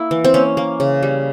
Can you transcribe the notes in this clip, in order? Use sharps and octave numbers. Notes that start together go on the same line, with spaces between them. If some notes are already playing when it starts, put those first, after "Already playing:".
Already playing: A#3 E4
E3
C4
A#3 C#4
A#3
C#3
G3